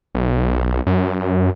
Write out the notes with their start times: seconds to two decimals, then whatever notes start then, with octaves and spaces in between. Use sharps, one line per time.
0.15 B1
0.87 F#2